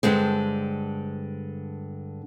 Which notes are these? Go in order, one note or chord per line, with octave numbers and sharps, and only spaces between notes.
G2 D3 G#3 C4